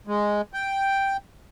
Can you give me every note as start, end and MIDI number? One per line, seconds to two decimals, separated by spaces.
0.07 0.41 56
0.54 1.17 79